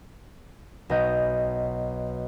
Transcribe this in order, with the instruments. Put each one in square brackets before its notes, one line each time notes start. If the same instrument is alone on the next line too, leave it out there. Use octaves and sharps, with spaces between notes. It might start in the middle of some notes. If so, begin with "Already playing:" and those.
[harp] B1 B3 D#5 G6